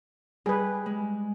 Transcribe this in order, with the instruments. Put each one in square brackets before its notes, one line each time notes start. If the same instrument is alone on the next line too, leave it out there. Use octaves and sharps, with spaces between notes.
[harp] G3 [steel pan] G#4 B4
[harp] G#3